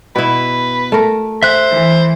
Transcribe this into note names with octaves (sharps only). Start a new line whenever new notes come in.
B2 E4 B4
A3 A#4
C5 E5 F#6
E3